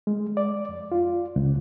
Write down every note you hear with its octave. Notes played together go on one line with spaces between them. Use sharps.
G#3
D5
F2
F4
C#2